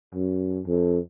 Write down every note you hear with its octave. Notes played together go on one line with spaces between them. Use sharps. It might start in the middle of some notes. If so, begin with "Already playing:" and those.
F#2
F2